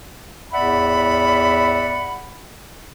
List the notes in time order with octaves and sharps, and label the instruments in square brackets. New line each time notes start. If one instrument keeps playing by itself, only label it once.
[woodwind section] E2 A2 D5 E5 F#5 B5